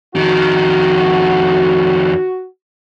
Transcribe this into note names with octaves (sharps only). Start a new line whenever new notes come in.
F2 D#3 F#4